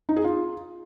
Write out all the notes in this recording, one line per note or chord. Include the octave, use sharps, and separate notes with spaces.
D#4
G#4
F4